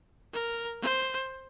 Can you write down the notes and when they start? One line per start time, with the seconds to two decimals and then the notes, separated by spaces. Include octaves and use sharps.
0.33 A#4
0.82 C5